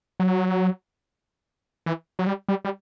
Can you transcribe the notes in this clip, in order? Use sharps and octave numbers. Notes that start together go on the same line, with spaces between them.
F#3
E3
F#3
G3
G3
G3